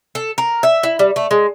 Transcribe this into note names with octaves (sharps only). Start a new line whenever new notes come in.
A4
A#4
E5
E4
G3
A3
G#3